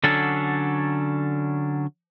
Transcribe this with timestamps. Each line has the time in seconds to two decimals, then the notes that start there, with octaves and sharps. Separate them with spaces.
0.04 D3 F#3 C#4 D4 A4